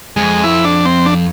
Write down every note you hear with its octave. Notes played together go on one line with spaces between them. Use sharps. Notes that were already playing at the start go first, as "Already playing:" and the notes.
F2 G#3
E4
D4
C4
D4